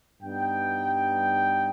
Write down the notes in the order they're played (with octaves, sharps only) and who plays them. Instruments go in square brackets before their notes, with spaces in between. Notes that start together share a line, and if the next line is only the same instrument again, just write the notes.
[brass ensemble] G2 G3 B3 D#4 G5